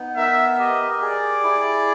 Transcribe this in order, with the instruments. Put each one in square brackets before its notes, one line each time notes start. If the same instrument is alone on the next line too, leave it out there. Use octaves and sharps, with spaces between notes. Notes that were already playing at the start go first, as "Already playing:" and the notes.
Already playing: [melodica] B3 D#4
[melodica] A#4 [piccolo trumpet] E5
[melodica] G4 [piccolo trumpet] D#5
[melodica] G#4 [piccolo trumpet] D5
[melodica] E4